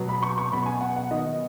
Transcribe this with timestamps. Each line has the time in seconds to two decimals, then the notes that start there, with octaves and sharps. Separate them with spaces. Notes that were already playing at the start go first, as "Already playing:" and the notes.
Already playing: B2 F#3 B3
0.09 B5
0.22 C#6
0.37 C#6
0.52 B2 F#3 B3 B5
0.66 G#5
0.81 F#5
0.96 F#5
1.11 D#3 B3 D#5